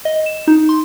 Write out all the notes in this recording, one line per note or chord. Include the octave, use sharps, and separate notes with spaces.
D#5
E7
D#4
C6